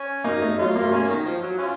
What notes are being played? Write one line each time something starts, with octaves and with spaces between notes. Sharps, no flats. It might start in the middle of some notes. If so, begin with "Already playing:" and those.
Already playing: C#4
A#3 D#4
A3
A3
F#3 F4
A#3
A3
A#3 C#4
D#3
F3
F#3
C#4 F4